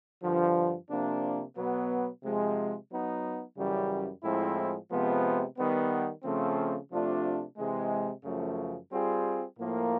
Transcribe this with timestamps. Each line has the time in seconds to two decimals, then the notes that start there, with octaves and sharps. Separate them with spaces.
0.22 G2 D3 F3
0.89 C3 F3 A#3 D4
1.56 B2 F#3 B3
2.22 C3 F3 G#3
2.90 F#3 B3 D#4
3.56 F#2 C#3 E3 G3
4.23 A2 F3 G#3 C4 E4
4.90 C3 F3 G#3 B3
5.57 D#3 G3 B3
6.23 C#3 F3 A3 C4
6.91 C3 F3 A3 D4 F4
7.57 C3 E3 G#3
8.24 F#2 C#3 F3 A3
8.91 G3 C4 F4 G#4
9.58 A2 F3 A#3